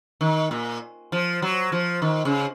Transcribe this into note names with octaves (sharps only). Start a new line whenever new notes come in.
D#3
A#2
F3
F#3
F3
D#3
C#3